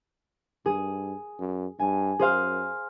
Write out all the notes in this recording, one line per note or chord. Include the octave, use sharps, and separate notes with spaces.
G2 G#4
F#2
G2 G#5
F#2 G#4 C5 F5